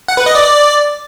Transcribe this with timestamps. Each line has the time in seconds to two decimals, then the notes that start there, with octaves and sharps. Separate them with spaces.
0.08 F#5
0.17 B4
0.26 D#5
0.35 D5